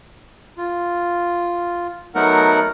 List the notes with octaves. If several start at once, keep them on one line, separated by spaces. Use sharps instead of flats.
F4
F#3 A3 B3 D#4 A#4 F#5